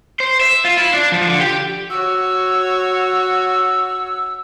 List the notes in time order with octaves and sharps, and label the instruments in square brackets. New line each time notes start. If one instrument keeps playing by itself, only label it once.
[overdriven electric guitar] C5
E5
F4
E4
D4
F3
D3
G4
[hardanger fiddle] F#4 C#5 [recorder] E6